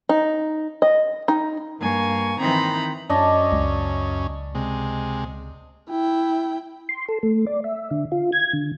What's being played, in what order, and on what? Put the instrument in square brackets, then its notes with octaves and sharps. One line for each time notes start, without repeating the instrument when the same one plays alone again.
[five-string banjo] D#4
D#5
D#4
[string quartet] G2 A#3 G#5 C#6
D#3 E3 C4 D#4 A#5 B5
[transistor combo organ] F#2 C#4 [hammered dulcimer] D5 D#5 A5
[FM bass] C#2
[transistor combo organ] C3 G#3
[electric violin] E4 G5
[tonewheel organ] C6
A4
A3
D5
E5
D3
F4
G#6
D3